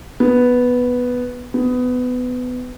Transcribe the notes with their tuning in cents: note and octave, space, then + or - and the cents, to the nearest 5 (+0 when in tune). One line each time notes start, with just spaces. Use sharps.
B3 +0
B3 +20